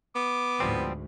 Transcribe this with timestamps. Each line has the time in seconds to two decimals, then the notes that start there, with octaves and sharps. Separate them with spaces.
0.15 B3 D6
0.60 D2 G#2 F3 G3 C4